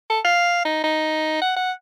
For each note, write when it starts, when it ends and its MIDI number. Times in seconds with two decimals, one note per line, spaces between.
0.10 0.20 69
0.25 0.61 77
0.65 0.80 63
0.84 1.39 63
1.41 1.56 78
1.57 1.72 78